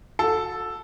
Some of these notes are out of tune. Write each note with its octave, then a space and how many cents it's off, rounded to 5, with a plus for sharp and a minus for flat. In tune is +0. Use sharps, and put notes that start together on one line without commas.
F#4 -35 A4 +0